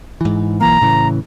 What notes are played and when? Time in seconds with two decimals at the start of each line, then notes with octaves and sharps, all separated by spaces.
0.21 G#2 E3
0.61 B1 E3 A#3 A#5
0.81 A2 C#3 E3